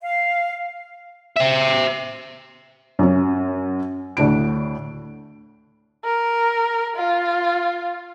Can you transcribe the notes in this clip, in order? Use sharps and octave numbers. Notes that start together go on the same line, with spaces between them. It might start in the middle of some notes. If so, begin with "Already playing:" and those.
F5
C5 E5
F#2 C#4
D2 A2 D4 D7
A#4
F4